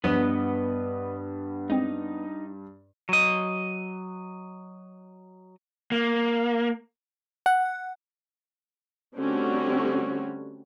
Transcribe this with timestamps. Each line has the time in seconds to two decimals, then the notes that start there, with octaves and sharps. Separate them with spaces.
0.04 G2 F3 F#3 B3 B4 D#5
1.70 G#3 C4 D#4
3.09 F#3 D#5
5.92 A#3
7.46 F#5
9.16 D3 G3 A3 C4 C#4 F#4